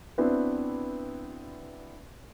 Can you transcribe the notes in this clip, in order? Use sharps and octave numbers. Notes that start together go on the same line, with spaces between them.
B3 C4 D4 E4 F#4 B4